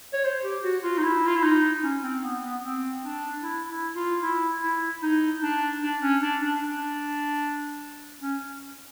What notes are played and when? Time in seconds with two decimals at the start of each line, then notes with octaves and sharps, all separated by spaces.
0.13 C#5
0.24 C5
0.44 G4
0.64 F#4
0.83 F4
0.98 D#4
1.04 E4
1.26 F4
1.36 E4
1.43 D#4
1.84 C#4
2.03 C4
2.23 B3
2.43 B3
2.63 C4
3.03 D4
3.43 E4
3.70 E4
3.96 F4
4.23 E4
4.63 E4
5.02 D#4
5.42 D4
5.82 D4
6.02 C#4
6.22 D4
6.42 D4
6.62 D4
8.21 C#4